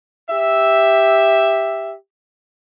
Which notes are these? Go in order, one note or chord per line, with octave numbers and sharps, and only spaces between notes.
G4 E5